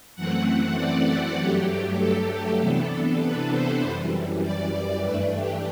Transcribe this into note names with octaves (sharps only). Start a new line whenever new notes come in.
F#2 E3 A3 C4 F#5
D5
G2 F#3 A3 G4
A4
C3 E3 B3 D4 A4
B4
C5
F#2 E3 G3
D5
G2 E3 A3 D4 B4
G4